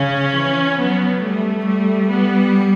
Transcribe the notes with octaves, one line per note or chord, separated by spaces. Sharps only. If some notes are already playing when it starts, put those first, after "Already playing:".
Already playing: C#3 C#4
E3
F#3 B3
G3 A3
G3
B3